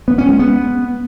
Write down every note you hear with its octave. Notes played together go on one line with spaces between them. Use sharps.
B3
C#4
G#3
B3